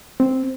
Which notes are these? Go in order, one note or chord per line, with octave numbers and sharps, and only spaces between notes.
C4